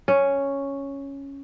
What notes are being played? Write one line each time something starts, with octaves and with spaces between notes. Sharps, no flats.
C#4